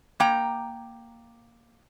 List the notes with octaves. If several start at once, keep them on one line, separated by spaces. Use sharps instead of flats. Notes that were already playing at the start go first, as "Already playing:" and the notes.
A#3 G5 A#5